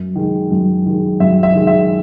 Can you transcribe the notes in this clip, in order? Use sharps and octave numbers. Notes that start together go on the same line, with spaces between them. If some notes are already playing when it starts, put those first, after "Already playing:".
Already playing: F#2
D#3 G#3
F#2
D#3 G#3
F#2 E5
E5
D#3 G#3
E5